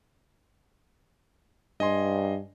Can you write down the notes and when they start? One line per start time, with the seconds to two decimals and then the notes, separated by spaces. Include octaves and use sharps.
1.80 G2 D#5 G#5 C6